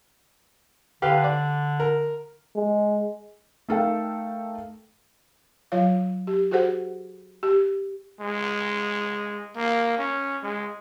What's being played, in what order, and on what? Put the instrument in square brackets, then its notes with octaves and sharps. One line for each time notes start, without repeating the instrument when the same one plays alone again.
[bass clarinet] D3 [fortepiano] G4 B4 F5
[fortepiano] D5
A#4
[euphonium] G#3
[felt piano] A3 D#4 A4 A#4 F5 G5
[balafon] F#3 F4 C#5 F5
G4
F#4 G#4 A4 C5 F#5
G4
[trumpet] G#3
A#3
C#4
G#3